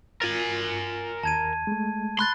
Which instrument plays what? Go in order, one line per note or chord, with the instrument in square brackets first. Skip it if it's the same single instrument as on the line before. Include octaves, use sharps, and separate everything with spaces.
[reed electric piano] F4 A6 [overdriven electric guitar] A#4 G#5
[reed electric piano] D#2 [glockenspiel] A5 G#6 D#7
[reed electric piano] G#3 A3
[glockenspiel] B5 F#6 A6 [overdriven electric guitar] C6